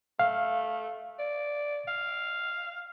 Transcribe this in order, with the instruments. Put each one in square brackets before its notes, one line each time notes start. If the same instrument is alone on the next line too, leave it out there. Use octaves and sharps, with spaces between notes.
[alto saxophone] A3 [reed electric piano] F5
[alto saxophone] D5
F5